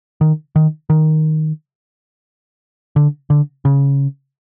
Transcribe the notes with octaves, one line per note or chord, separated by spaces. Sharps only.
D#3
D#3
D#3
D3
D3
C#3